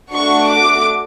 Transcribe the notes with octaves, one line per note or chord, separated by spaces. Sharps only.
A3 D4 F#4 C#6
D6